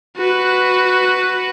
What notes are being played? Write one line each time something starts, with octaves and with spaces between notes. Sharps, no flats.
F#4 B4